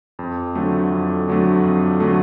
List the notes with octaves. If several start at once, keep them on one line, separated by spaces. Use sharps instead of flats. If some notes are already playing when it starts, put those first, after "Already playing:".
F2
D3 F#3 A3
F2
D3 F#3 A3
F2
D3 F#3 A3